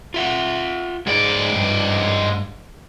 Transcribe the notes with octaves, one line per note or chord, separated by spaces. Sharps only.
F4 E5 F#5
G#2 G#3 D#4 D5
G2